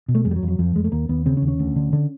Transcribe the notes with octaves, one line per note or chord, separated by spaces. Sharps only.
B2
A3
F2 G#3
G3
F#3
F2
F#3
F2 F3
F2 G#3
A3
D#2 A#3
D#2 B3
C#3 C4
C#4
D#2
C#4
D2
D3
D3